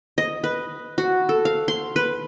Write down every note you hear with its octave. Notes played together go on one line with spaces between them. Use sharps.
D#5
B4
F#4
A4
F5
C6
B4